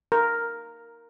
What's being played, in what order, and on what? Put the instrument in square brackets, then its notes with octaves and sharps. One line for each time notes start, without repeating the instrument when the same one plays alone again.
[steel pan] A#4